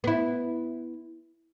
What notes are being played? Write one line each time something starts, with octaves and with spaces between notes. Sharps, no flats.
B3 E4